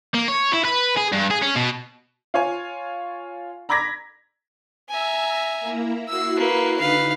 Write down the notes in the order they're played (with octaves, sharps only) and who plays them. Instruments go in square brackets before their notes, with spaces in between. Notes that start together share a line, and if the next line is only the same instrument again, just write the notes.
[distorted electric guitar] A#3
C#5
E4
B4
G#4
G2
G#4
C#4
B2
[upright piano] F4 C#5 G#5
A#5 B5 D6 G#6 A#6 B6
[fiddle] E5 G#5 [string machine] A#5 E6
[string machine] A#3 E4
[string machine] E4 F#4 C7 [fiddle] E6
[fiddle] A#3 B4
[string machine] D3 D#4 [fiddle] B4 F5